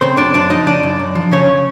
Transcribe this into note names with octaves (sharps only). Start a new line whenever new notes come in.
C#3 C4 C5
F#2 D4 D5
F#2 D4 D5
F3 D#4 D#5
C#3 D4 D5
F#2
F#2
F3
C#3 C#4 C#5